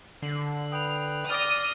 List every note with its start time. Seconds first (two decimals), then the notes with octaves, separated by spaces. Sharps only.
0.22 D3 C7 F#7
0.72 B4 G5 D#6 F7
1.30 D5 D#6 F6 A#6